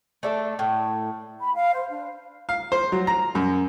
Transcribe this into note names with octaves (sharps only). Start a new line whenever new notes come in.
A3 D4 A4
A2
B5
F5
C5
D4
F5
C5
F#3
A#5
F#2